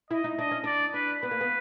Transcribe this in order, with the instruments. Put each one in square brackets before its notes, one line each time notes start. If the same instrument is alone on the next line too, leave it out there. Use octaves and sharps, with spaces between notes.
[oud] E4 [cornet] D#5
[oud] D#4
[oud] D4 [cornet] D#5
[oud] C#4
[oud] D4 [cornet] D5
[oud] D4 [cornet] B4
[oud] B3 [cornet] B4
[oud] A#3
B3